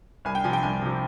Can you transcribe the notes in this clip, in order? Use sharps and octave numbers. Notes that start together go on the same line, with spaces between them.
C2 G#5
G5
C3 F3 G#5
G5
C2 G#5
C3 F3